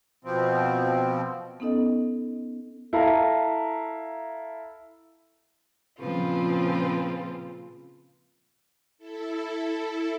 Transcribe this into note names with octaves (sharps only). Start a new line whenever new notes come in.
B2 F3 C4
B3 C#4 D#4 A4 D#5
E4 A4 F5 A#5
A#2 C#3 F3 C4 F4 B4
E4 A4